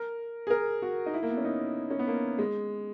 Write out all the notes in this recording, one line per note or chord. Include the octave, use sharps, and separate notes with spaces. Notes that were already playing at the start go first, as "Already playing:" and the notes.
Already playing: A#4
G#4
A#4
F#4
D#4
E4
A#3
B3
C#4
D#4
C#4
B3
A#3
G#3